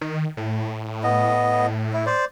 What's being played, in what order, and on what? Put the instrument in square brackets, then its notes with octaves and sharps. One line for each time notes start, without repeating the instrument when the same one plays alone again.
[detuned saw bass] D#3
A2
[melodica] B3 D#5
E4
C5 D5